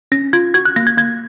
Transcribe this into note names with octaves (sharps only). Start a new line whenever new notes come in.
C#4 A#6
F4 G#6
F#4 G#6
F#6
A#3 A#6
G#6
A#3 G#6